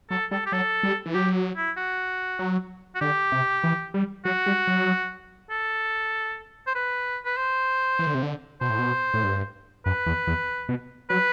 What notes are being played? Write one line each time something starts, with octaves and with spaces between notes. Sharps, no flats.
F#3 A4
G3 A4
G4
F#3 A4
G3
E3
F#3 G4
E4
F#4
F#3
F#4
D3 G4
C3
E3
G3
F#3 F#4
G3
F#3
A4
C5
B4
B4
C5
E3
D3
C3
D3
B2 C5
A2
B2
A2
G2
F#2 B4
E2
E2
B2
F#3 B4